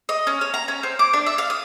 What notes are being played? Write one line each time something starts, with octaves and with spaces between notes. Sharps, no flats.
D#5
C#4
C#5
A#5
C#4
C4
D6
D4
E5
F5
D#6